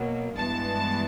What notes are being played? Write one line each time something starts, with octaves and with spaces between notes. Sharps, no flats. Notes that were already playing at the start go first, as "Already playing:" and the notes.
Already playing: B2 F#3 A#3
G2 E3 G#3 B3 A5